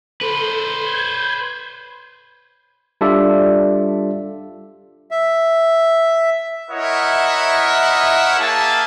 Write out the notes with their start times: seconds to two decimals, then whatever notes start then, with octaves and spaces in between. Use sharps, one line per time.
0.21 A4 B4 C5
0.86 G6 G#6
3.01 G3 D4 F4 A4 D5 E5
5.11 E5
6.70 E4 A#4 C#5 D#5 E5 F#5
8.38 A#3 G#4 E5 A5